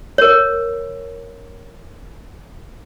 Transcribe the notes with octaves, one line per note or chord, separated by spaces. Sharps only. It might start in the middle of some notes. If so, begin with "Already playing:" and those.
A#4 C#5